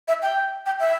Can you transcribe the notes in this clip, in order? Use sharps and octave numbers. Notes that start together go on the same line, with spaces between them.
E5
G5
G5
E5